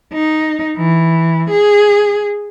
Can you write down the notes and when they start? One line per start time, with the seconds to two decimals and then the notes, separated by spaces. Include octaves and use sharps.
0.13 D#4
0.77 E3
1.50 G#4